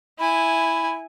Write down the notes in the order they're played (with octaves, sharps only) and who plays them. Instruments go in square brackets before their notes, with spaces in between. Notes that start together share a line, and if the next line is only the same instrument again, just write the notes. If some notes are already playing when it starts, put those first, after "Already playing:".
[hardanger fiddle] E4 G#5 [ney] B5